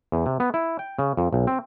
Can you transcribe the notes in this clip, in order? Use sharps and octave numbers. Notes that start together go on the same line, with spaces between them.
E2
C3
B3
E4
G5
C#3
F2
B1
C4